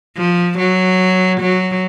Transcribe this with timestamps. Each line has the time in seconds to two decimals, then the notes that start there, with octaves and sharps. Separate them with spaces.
0.17 F3
0.59 F#3
1.41 F#3